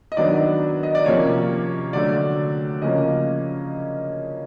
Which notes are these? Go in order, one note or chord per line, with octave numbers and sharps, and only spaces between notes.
D#5
D#3 F#3 B3 D4 D5
D#5
D5
C3 F3 A#3 C#4 C#5
D3 F#3 A3 D5
C#3 F3 A#3 C#4 D#5